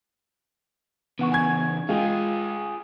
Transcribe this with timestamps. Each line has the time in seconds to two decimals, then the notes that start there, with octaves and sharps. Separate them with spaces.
1.19 C#3 E3 B3 F#5 C#6
1.32 G#5 G#6
1.89 G#3 F4 G#4 F5 G5